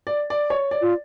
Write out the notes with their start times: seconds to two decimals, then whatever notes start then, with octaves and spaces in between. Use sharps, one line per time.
0.07 D5
0.30 D5
0.50 C#5
0.71 D5
0.81 F4